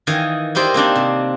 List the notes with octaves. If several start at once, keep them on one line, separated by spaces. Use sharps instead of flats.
D#3 E3 D#5 F5 G#5
E4 G4 A#4 C5 D5 D#5
A#3 C4 D4 D#4
C3